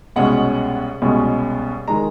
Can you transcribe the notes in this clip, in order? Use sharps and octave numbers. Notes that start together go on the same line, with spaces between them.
C2 B2 G#3 C#4 F#5
C2 B2 G#3 C#4
D#3 G#3 A#5